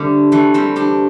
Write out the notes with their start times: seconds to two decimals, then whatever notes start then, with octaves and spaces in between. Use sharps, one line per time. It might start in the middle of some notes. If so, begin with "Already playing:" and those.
Already playing: D3 G3 A3 C4 D4
0.32 E3 A3
0.54 G3 C4
0.76 D4 G4